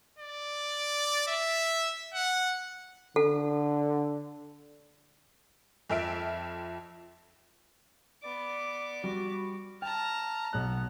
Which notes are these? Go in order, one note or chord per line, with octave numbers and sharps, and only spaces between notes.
D5
E5
F#5
D3 A4
F2 F4 E5 D7
B3 D5 D6
G3 F#4
G5 A5 A#5 F6
B1 B3 F#6